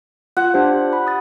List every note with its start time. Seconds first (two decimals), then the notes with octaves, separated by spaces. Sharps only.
0.37 F4 F#5
0.54 D4 G4 C5
0.93 B5
1.07 D#6 A6